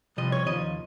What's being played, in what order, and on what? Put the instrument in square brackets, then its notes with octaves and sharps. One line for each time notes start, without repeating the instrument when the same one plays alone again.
[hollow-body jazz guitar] C2 C3 F3 D#5
C#5
D#2 C#3 F3 D#5